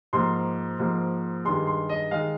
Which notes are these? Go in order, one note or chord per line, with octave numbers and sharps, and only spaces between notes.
G#2 F3 A#3 C6
G#2 F3 A#3
G2 D#3 G#3 C6
C6
D#5
D#3 G#3 F5